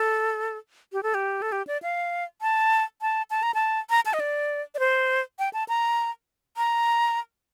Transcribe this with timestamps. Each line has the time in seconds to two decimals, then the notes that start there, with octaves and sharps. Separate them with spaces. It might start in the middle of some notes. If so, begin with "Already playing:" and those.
Already playing: A4
0.93 G4
1.03 A4
1.14 G4
1.42 A4
1.52 G4
1.67 D5
1.83 F5
2.42 A5
3.02 A5
3.30 A5
3.43 A#5
3.54 A5
3.90 A#5
4.06 A5
4.14 D#5
4.20 D5
4.75 D5
4.79 C5
5.39 G5
5.53 A5
5.69 A#5
6.57 A#5